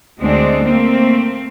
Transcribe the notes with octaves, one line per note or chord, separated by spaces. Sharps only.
D2 G#3 C4 D4
A3 A#3 C4